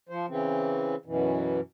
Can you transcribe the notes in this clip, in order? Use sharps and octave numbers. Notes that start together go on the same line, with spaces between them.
F3 C5
C#3 E3 C4
F#2 B2 E3